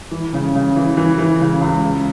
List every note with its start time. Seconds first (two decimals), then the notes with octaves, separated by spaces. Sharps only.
0.11 E3
0.33 C#3
0.55 C#3
0.76 E3
0.97 E3
1.18 E3
1.40 C#3
1.61 C#2
1.83 C#3